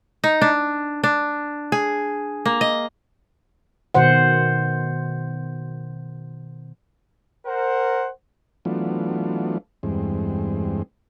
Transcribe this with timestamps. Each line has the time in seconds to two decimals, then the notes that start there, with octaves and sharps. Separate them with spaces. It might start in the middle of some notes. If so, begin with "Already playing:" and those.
0.24 D#4
0.41 D4
1.04 D4
1.72 G#4
2.46 A#3
2.61 D#5
3.94 B2 D#3 C5 F#5
7.46 A#4 C5 F#5
8.65 E3 F#3 A3 B3 D4 F4
9.83 E2 G2 G#3 C4